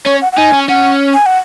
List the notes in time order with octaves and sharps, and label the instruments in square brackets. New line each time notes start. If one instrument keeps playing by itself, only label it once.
[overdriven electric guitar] C#4 [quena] C#5
[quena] F#5
F#5
[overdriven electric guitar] D#4 [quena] G#5
[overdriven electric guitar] C#4
[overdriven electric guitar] C#4 [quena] F#5
[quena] G#5
F#5